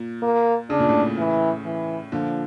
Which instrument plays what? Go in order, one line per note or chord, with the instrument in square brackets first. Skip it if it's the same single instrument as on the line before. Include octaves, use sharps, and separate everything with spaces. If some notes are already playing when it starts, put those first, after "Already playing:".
Already playing: [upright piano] A#2
[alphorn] A#3
[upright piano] C#3 [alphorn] D4
[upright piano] A#2
A2 C#3
[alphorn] E3
E3
[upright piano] A#2 D3 [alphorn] F3